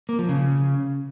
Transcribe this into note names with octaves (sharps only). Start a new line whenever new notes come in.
A#3
F3
C#3